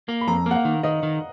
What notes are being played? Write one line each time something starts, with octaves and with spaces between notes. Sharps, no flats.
A#3
B5
F2 A#5
A#3 F#5
F5
D#3
D#3 D#5
D#3